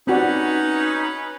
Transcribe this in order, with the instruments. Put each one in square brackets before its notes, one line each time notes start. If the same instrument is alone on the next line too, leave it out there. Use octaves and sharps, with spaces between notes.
[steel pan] C4 F#4 D5 [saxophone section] C#4 B4 [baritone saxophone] D#4